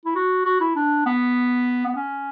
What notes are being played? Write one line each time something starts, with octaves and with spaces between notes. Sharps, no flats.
E4
F#4
F#4
E4
D4
B3
B3
C#4